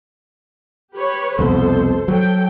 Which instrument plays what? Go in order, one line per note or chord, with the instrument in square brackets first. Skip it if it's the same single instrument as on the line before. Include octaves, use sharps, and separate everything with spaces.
[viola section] G4 B4 C#5
[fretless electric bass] C2 F2 B2 [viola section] A4 C5
[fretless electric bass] F#3 [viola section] A4 G5